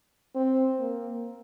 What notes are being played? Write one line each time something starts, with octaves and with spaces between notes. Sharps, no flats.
C4
A#3